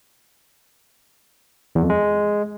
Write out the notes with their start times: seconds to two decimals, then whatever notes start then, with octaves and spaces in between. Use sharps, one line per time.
1.75 E2
1.83 F2
1.90 G#3